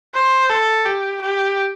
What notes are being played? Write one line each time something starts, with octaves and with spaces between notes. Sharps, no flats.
C5
A4
G4
G4